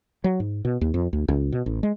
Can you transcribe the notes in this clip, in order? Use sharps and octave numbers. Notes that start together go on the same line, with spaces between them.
F#3
G#2
B2
D#2
F2
D2
C#2
B2
A1
G#3